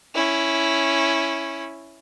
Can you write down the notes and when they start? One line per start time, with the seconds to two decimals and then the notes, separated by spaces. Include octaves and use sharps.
0.15 C#4 E4